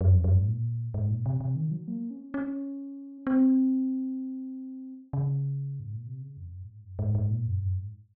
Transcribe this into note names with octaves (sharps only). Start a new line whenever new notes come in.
F#2
F2
F#2
G#2
A#2
G#2
A#2
C3
C3
D#3
F#3
A#3
C#4
C#4
C4
C#3
G#2
A#2
C3
C#3
F2
F#2
A#2
G#2
F#2
G#2
G#2
A#2
F#2
G#2
F#2
G#2